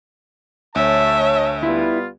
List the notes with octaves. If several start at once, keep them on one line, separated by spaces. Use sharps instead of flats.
D2 C#5 E5 A5
G3 B3 E4 F4